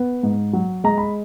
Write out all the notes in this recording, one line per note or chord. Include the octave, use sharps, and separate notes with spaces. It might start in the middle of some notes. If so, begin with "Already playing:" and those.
Already playing: B3
G#2
F#3
G#3 A#5
B5